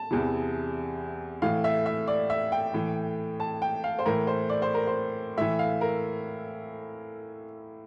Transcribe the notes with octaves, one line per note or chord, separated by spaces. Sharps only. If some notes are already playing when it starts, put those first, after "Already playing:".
Already playing: A5
E2 C3 E3
A2 E3 F5
E5
E5
D5
E5
G5
A2 E3
A5
G5
F5
C5
A2 E3 A#4
C5
D5
C5
A#4
C5
A2 E3 E5
F5
A#4